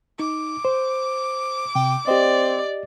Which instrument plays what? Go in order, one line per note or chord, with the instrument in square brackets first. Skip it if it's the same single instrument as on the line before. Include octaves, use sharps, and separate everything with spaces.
[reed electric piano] D#4 [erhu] D6
[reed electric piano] C5
[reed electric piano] C3 [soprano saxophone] G5
[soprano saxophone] C4 [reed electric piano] G4 D#5 [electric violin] D5